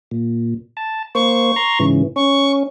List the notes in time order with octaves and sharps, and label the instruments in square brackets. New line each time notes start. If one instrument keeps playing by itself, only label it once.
[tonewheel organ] A#2
A5
[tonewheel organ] A#3 C5 [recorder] C#6
[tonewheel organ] A#5 C6
G#2 C#3 E3
[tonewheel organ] C#4 [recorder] C#6